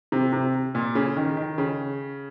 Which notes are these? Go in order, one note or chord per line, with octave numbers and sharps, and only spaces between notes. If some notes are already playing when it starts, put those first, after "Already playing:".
C3
C3
A#2
C#3
D#3
D#3
C#3